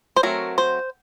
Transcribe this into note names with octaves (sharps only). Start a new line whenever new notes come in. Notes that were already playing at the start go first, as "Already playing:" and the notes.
C5
F#3 A3 C4 A#4
C5